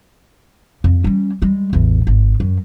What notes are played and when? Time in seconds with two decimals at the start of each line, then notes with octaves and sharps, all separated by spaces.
0.84 F2
1.04 G3 C#4
1.42 G3 G#3
1.73 A1 E2
2.07 G#1
2.40 F#2